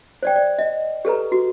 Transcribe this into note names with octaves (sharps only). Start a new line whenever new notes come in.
C5 D5 G5
D5
D#5
G4 A4 B4 A#5
F#4